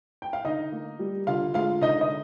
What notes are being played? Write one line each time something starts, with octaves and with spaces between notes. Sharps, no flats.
G5
F5
D3 D#4 D#5
A#3
G3
D3 F4 F5
G#3 F4 F5
D3 D#4 D#5
D#5